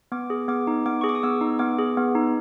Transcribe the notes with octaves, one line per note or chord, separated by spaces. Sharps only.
B3 D6
G#4
B3 D6
D#4
B3 D6
G#4 C#6
D6
D#6
B3 E6
D#4
B3 D6
G#4
B3
D#4